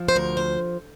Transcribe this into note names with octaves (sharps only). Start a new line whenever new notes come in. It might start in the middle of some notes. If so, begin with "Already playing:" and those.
Already playing: F3
C5
D2 A#4
C5